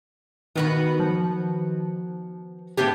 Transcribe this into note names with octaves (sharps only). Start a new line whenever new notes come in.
D#3 B3 F#4 B4
F3
A2 B3 D4 G4 G#6